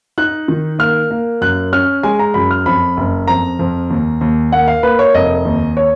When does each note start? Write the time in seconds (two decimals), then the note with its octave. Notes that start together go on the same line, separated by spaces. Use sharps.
0.18 D#4 F#6
0.48 D#3
0.79 A#3 F6
1.11 A#3
1.41 F#2 F#6
1.73 C#4 F6
2.03 G#3 G#5
2.19 A#5
2.34 F#2 B5
2.51 F6
2.66 F2 B5
2.97 F#1
3.28 F2 A#5
3.59 F2
3.90 D#2
4.21 D#2
4.52 A#3 F#5
4.68 F5
4.83 A#3 B4
4.99 C#5
5.14 F1 D#5
5.45 D#2
5.77 C#5